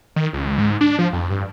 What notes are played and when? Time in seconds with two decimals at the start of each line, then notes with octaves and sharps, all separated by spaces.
0.16 D#3
0.33 C#2
0.58 G#2
0.81 D4
0.99 F3
1.13 F2
1.30 G2